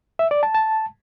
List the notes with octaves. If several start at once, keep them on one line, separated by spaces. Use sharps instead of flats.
E5
D5
A5
A5